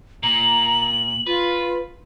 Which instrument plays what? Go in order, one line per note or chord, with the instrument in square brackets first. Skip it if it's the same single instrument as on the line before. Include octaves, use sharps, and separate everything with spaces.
[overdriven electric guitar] A#2 [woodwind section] A#5 [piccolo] F#7
[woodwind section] F4 [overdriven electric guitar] B4